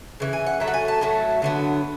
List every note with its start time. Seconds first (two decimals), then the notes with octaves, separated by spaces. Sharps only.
0.20 C#3 E3
0.33 G#5
0.46 F#5
0.60 A2 F#3 A3 E5
0.68 F#5
0.74 G#5
0.88 A5
1.01 A2 F#3 A3
1.42 D3 F#3 B3